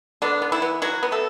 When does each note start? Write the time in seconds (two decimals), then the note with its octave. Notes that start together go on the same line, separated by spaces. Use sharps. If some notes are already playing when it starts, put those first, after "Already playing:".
0.22 D3 B3 D4
0.42 B3
0.52 E3 E4
0.62 B3
0.82 E3 F#3 F#4
1.03 B3
1.12 A3 A4